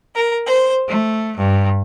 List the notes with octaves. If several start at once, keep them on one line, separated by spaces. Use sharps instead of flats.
A#4
C5
A3
G2